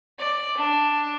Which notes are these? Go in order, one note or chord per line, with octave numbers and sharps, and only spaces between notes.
D5
D4